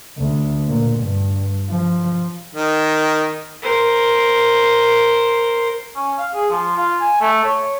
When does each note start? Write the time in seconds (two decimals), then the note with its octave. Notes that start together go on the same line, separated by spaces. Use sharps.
0.18 D2
0.68 A#2
1.00 G2
1.69 F3
2.55 D#3
3.62 A#4 C5
5.95 C#4
6.18 F5
6.34 G#4
6.50 F3
6.76 F4
7.00 G#5
7.20 A3
7.44 C#5